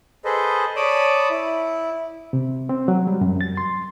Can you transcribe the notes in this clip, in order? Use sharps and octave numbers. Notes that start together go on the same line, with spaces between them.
G#4 A4 B4 C5 D#5
C#5 D5 A5 B5 D6 D#6
E4
C3
C4
F#3
G3
F#2
A6
C6